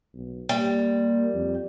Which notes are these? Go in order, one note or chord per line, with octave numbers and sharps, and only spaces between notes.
B1
G3 A#3
F2